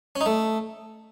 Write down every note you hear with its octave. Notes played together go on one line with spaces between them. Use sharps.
C#4
D#4
A3